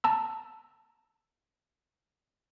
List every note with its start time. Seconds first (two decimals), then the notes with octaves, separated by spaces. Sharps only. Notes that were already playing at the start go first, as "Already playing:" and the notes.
0.04 A5 A#5 E6